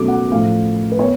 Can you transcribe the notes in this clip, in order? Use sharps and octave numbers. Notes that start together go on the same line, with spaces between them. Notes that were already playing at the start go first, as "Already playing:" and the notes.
Already playing: B2 F#3 A3 C#4 D6
F#5
A2 F3 A3 F5
B4
B3 C#5